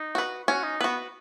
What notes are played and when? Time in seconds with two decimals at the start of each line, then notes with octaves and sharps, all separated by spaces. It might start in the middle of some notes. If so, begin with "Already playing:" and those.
Already playing: D#4
0.15 F#4 B4
0.48 C#4 F#4
0.64 D#4
0.81 B3 F#4 B4